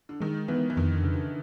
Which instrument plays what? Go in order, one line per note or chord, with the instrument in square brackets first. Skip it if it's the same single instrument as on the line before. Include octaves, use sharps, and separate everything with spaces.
[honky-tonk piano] D3
[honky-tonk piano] D#3 [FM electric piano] G#3
[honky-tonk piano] E3 [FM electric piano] B3
[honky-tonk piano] E3
[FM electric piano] F2 [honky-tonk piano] D#3
[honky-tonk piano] D3
[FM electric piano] C#3
[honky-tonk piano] D3